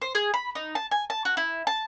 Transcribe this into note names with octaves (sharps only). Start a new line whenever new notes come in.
C5
G#4
B5
D#4
A5
G#5
A5
F#4
E4
A5